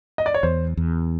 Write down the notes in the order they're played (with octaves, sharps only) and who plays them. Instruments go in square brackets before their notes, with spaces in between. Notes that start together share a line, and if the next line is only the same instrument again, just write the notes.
[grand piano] D#5
D5
C#5
[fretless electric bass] E2 [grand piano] C5
[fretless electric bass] E2